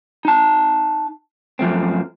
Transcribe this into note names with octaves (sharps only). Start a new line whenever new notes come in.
D#4 A5
F#2 F3 A3 C4